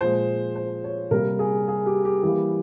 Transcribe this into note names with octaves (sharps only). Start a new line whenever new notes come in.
A#2 F3 G#3 C5
C5
C#5
C3 G3 A#3 A#4
G#4
G#4
G4
G4
E3 G3 A#3